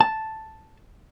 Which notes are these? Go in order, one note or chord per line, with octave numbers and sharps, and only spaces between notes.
A5